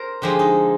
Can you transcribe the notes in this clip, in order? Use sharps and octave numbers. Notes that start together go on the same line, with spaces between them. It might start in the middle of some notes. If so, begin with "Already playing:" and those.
Already playing: A#4 C5
D3 F3 G#3 G4
D#4